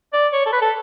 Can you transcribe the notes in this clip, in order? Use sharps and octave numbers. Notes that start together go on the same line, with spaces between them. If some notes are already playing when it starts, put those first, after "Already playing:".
D5
C#5
A4
B4
A4